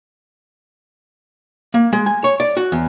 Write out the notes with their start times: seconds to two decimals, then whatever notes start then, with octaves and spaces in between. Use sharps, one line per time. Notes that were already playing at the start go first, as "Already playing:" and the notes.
1.74 A#3
1.93 G#3
2.06 G#5
2.24 C#5
2.40 D5
2.57 F#4
2.72 E2